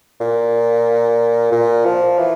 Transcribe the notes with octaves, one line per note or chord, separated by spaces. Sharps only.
A#2
A#2
F3
E3